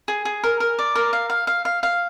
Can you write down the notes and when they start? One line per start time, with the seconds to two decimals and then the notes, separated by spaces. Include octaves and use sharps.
0.08 G#4
0.25 G#4
0.44 A#4
0.60 A#4
0.79 D5
0.95 A#4
1.13 F5
1.30 F5
1.47 F5
1.65 F5
1.83 F5